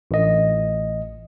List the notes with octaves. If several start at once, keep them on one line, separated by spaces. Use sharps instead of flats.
A1 D#5